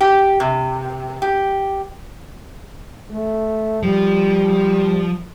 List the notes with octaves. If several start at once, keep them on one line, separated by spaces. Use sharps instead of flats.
G4
C3
G4
A3
F3 G3